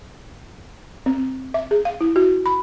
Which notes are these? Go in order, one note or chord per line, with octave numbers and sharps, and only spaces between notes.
C4
E5
G#4
F5
E4
F#4
B5